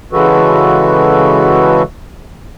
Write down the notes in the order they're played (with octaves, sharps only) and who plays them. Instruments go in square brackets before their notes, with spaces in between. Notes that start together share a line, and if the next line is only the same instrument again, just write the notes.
[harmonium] C#3 E3 G#3 F#4 A4 B4